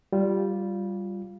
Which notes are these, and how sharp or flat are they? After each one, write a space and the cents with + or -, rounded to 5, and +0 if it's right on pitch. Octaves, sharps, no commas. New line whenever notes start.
G3 -5 F4 +0